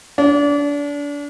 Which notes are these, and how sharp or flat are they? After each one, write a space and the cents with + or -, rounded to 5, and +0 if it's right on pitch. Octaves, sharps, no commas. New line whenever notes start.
D4 -30